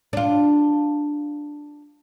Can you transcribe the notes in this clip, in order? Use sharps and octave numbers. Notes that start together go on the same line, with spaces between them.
D4 F4